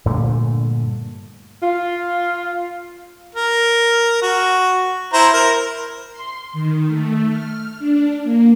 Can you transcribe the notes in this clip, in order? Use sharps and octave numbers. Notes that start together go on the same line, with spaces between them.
G2 A#2 D3 A3
F4
A#4
F#4
E4 C5 A#5
A#4
C6
D#3
A3
F6
D4
A#3